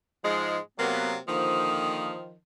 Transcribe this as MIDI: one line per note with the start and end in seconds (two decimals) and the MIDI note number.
0.24 0.59 44
0.24 0.59 53
0.24 0.59 56
0.79 1.18 48
0.79 1.18 54
0.79 1.18 58
0.79 1.09 59
1.28 2.15 50
1.28 2.36 51
1.28 2.36 53
1.28 2.15 58
1.28 2.15 87